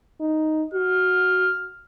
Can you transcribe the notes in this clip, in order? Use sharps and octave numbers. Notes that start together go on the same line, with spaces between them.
D#4
F#4 F6